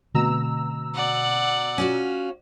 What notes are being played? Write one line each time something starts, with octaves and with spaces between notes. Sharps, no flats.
B2 D3 A3 C4 A#5 E6
D5 F#5
C#4 F4 F#4